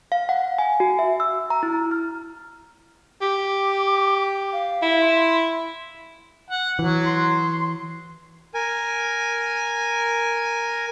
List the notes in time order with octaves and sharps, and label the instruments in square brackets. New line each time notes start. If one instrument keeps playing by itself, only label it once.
[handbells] F5
F#5
G#5
F#4
E5
E6
A#5
E4
F6
[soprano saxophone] G4 [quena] D6
[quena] F5
[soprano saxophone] E4
[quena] C6
[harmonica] F#5
[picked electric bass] E3 [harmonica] F#3
[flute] C6
[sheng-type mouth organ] A#4 G#5